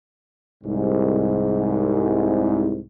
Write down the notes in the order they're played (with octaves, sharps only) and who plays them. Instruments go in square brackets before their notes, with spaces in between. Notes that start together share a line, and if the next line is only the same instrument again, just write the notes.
[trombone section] C2 G#2